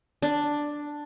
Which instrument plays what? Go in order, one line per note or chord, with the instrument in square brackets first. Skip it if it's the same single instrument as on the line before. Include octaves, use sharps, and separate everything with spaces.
[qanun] D4